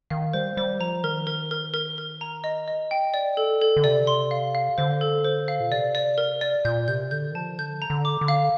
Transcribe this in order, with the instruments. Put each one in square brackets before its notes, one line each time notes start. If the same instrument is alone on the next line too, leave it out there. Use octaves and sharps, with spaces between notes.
[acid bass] D#3 [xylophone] F5
[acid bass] G3 [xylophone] C5
[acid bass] G3 [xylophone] C5
[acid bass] F3 [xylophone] A#5
[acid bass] D#3 [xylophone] A#4
[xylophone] A#4
A#4
A#4
A#4
A#5
D#5
D#5
G5
D5
A4
A4
[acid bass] D3
[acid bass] C3 [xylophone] D5
[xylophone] C6
F5
F5
[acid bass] D3 [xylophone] C5
[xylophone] A4
C5
F5
[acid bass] A#2
[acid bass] C3 [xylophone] D5
[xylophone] D5
A#4
D5
[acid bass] A#2 [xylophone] G6
[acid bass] C3 [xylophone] G6
[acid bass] D3 [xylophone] G6
[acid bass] D#3
[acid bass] F3 [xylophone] A5
[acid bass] D3 [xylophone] G6
[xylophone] A#5
[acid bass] D3
[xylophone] D6
[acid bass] D3
[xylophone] F5